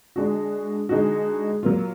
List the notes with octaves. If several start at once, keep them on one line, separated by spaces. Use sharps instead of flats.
D3 G#3 D4 F#4
D3 G#3 D#4 F#4
F#3 A#3 F4